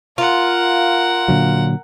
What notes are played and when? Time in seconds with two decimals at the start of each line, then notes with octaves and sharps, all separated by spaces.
0.18 F4 A#4 F#5
1.28 A#2 D3 F#3